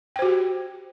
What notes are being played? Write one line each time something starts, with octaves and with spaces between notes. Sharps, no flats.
F#4 G4 C5 G5